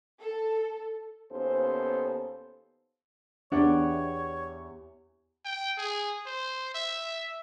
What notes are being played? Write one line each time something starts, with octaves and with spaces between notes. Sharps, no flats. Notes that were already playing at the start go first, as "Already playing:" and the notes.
A4
D#2 B3 C#4 A4 C5
E2 D4 G4 C#5 D5 F#5
G5
G#4
C5
E5